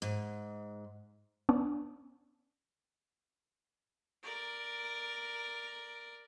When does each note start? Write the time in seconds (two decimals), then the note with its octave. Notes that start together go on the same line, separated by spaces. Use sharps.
0.02 G#2
1.49 B3 C#4 D4 D5
4.23 A#4 D5